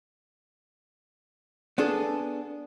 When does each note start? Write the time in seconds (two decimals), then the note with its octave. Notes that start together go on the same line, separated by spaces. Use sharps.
1.78 B3 D4 G#4 A4